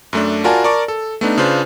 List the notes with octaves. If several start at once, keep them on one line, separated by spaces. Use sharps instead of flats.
F#2 A3 D4
F4 F#4 A#4 D5 G#5 A5
A#4 D5 A5 C#6 D6
A4
A3 B3 D4 D#4
C#3 D4 F4 B4 C5